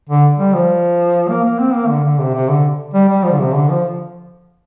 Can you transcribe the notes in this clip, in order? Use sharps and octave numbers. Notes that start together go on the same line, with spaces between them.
D3
G3
F3
A#3
A#3
C4
A#3
D3
D3
C3
C3
D3
G3
G3
F3
D3
C3
D3
F3